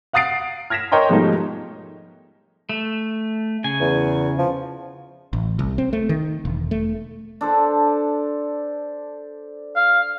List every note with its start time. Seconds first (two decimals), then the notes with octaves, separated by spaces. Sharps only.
0.13 F5 F#5 D#6 A6 C7 D7
0.70 F6 G#6 A#6 B6 E7
0.92 A#4 C#5 D#5 G5 A#5 C6
1.09 G#2 B2 F3 G3 A3 D#4
2.69 A3
3.64 C#3 G#5
3.80 E2
4.38 F3
5.33 A1
5.59 C2
5.78 C4
5.93 A3
6.09 D#3
6.45 E1
6.71 A3
7.41 D4 A4 C5
9.76 F5